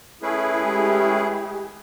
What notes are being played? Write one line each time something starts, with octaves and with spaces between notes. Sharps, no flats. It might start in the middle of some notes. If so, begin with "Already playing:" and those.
A3 C#4 E4 G#4 B4
G#3 G4